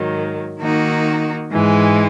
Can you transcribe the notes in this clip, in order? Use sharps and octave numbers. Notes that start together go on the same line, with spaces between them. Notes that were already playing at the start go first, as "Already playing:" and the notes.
Already playing: G#2 D#3 F#3
D#3 A#3 D#4 F#4
G#2 E3 G#3